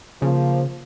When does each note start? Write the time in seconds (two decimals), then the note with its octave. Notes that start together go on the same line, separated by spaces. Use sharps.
0.22 C#3 F3 A#3